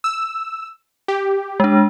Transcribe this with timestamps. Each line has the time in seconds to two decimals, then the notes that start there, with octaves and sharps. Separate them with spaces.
0.04 E6
1.08 G4
1.60 G#3 D4